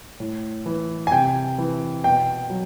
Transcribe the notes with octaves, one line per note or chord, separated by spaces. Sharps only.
A2
E3
G#5
C3 G5
E3
B2 G5
F#3